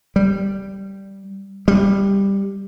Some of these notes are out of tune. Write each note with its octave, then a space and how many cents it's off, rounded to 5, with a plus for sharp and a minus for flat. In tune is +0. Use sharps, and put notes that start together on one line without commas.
G3 -5
G3 +10